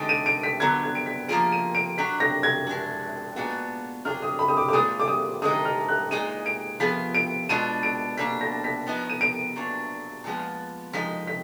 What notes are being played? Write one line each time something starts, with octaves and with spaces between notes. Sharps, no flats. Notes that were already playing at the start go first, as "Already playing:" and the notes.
Already playing: D3 G#3 D#4 D7
D#7
D7
B6
D3 F#3 B3 G#6
G#6
D7
B6
F3 A#3 F4 G#4 D7
D#7
D7
F#3 D4 F#4 B6
A#6
G#6
G#3 D4 F#4
A#2 G#3 B3 D4 F#4
F#3 D4 F4 G#4 F6
D#6
B5
D#6
D6
D6
A#2 G#3 D4 F4 G#4 D#6
D6
D#6
D3 G#3 D#4 D#6
F6
F#6
A#2 G#3 D#4 G#4 D#7
D7
F3 B3 F4 G#4 B6
D7
B2 G#3 B3 D4 F4 D#7
D7
B2 A#3 D4 B6
A#6
B6
F3 B3 D#4
D#7
D7
A#2 F#3 D4
A#2 F3 G#3 B3
F3 G#3 D#4 B6
B6